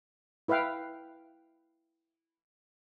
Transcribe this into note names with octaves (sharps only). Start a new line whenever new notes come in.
E4 B4 E5 F5 G5